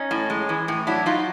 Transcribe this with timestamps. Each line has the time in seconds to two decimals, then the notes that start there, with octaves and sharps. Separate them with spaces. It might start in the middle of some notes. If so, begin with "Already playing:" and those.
Already playing: C#4 D#4
0.11 A2
0.30 G#3
0.49 E3
0.68 A2
0.87 F#3 D4 E4
1.06 F#3 D#4 F4